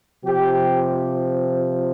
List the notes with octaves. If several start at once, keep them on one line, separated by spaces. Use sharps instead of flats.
C3 F3 G4